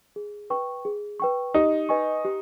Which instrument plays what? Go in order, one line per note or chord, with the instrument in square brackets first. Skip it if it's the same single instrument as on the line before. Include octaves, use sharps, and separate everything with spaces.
[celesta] G#4
B4 G5 C#6
G#4
B4 G5 C#6
[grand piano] D#4 [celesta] G4
[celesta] B4 D#5 G#5 C#6
G4